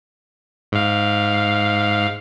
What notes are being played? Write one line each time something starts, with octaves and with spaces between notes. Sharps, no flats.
G#2 F5